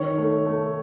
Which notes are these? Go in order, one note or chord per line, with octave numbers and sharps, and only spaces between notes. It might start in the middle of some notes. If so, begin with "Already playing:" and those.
Already playing: D#3 C#5
A3
A3